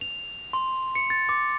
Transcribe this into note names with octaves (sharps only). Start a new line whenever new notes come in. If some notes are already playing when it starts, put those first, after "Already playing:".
F7
C6
C#7
A6
D6